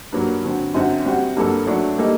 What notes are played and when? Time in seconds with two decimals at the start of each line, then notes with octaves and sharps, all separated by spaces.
0.12 G2 F#3 A#3
0.44 D3 F#3 C4
0.74 F#2 D3 F#3 C4 F#4
1.06 G3 C4 F#4
1.37 G2 F#3 A#3 F#4 A4
1.67 F#3 A3 D4
1.98 G3 A#3 D#4 A4